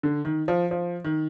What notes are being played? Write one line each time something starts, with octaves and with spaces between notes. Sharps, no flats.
D3
D#3
F3
F3
D#3